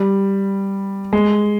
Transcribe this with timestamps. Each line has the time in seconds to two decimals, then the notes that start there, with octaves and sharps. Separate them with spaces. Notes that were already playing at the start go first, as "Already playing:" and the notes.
Already playing: G3
1.13 G#3